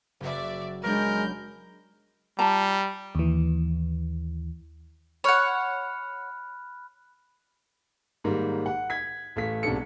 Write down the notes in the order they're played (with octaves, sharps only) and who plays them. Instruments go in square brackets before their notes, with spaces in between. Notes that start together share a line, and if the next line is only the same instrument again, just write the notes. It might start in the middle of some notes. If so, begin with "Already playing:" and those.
[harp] F#1 F#4 [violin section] D5 E5
[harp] F#3 B3 D4 [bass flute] G#3 [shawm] A#4 [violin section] G6
[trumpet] G3 [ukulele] F4 A5 A#5
[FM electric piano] D#2 E3
[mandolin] C#5 F#5 [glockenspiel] B5 F6 F#6
[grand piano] G#2 D#3 G3 A#3
F#5
G#6 B6
A1 A3 F5 B6
B1 G#2 C3 D4 A4 C#7